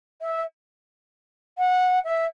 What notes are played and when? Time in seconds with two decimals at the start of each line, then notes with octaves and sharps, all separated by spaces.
0.21 E5
1.58 F#5
2.05 E5